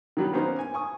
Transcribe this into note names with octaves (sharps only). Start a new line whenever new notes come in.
D#3 F#3 G3
A#3 B3 C#4 D#4 C5
G#5
G#5 C#6 D#6